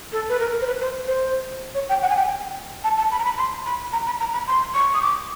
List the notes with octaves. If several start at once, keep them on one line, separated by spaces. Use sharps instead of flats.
A4
B4
A#4
C5
B4
C5
C5
C#5
G5
F#5
G#5
G5
A5
A5
B5
A#5
B5
C6
B5
A#5
B5
A#5
B5
C6
C#6
D#6
D6